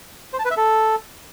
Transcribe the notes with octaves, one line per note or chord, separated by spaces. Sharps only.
C5
A5
B4
E5
A4